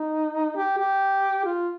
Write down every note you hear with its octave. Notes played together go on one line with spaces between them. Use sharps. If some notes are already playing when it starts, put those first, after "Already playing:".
Already playing: D#4
G4
G4
F4